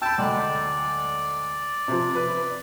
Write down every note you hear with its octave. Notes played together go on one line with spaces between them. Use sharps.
G5 A5 B5 E6
D2 F#3 G#3 D5
C3 F3
B4